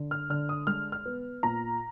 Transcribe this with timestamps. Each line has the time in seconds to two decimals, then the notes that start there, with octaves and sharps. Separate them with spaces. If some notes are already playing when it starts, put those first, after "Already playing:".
Already playing: D3
0.11 F6
0.30 D3 F6
0.49 D#6
0.67 G#3 F6
0.92 F6
1.06 B3
1.43 A#2 A#5